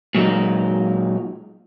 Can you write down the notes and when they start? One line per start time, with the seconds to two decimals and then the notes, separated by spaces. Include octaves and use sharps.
0.15 A#2 F#3 G#3 D#4